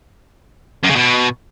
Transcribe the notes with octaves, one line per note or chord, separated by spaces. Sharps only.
F#2
C#3
B2